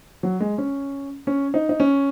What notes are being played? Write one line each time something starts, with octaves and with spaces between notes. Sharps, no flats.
F#3
G#3
C#4
C#4
D#4
D#4
C#4